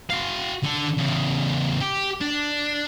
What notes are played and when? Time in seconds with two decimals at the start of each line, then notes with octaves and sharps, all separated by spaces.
0.11 F#4 F5
0.63 D3 A4
0.98 E2 C#3
1.81 G4
2.21 D4